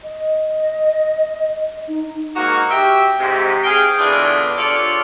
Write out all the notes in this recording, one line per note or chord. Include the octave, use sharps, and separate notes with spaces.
D#5
D#4
G#2 A#3 D#4 F#4
G4 E5 G5
G#2 C3
G#4 F5 G5
B2 D3 E3 D4 F4 G#4
D4 F4 G4 A4 C#5 D5